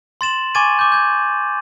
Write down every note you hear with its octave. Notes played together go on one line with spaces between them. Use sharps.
C6 A6 E7 F#7
G#5 C#6 D6 G#6 A6 D#7
D6 G6
G6 G#6